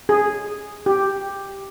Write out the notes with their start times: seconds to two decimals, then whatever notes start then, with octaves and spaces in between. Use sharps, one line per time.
0.09 G#4
0.86 G4